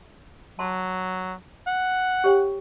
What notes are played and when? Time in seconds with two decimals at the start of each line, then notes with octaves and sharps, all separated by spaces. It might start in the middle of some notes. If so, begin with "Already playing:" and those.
0.59 F#3 A5 C6
1.67 F#5
2.24 G4 C#5 G5